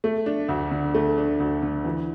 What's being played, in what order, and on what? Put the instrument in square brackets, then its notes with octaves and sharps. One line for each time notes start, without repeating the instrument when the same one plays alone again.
[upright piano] A3
D4
D2
D3
A3
D4
D2
D3
E3